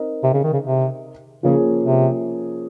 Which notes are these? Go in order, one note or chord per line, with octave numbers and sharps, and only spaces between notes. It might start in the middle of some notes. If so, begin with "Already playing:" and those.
Already playing: C4 D#4 A#4 D#5
C3
C#3
D#3
C#3
C3
C#3 F3 A#3 C#4 G#4
C3